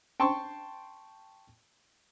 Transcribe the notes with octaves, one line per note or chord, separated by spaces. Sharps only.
G5 A5 C6 C#6